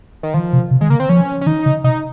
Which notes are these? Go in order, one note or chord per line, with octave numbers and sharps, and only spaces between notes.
D#3
D#3 F3
C3
C3
D#3 G#3
C#3 A#3
C4
F3 C#4
C#4
D#3 D#4
C#3
C3 D#4